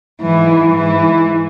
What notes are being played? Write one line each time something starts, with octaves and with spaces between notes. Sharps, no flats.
G#2 E3
G#2 E3